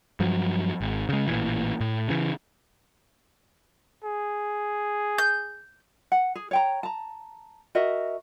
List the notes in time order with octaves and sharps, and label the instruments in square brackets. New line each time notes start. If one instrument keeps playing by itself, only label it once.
[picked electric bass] G2 F3 F#3
G#1
C#3 G#3
A1 A#2 E3
A2
C#3 E3
[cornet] G#4
[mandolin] G6
[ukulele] F#5
G#4
C#5 G5 A#5
A5 A#5
F#4 A#4 D#5 E5